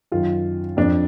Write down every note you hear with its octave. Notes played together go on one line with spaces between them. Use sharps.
F#2 D#3 F4
F2 F3 D4